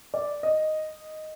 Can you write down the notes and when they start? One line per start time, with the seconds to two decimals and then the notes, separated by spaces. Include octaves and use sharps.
0.14 D5
0.43 D#5